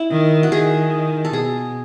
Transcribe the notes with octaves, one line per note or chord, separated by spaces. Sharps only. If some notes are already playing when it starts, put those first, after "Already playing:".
Already playing: E4
D#3
F#4
D#3 G#4
A4
B2 G#4